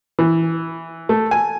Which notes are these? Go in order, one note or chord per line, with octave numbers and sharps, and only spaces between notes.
E3
A3
G#5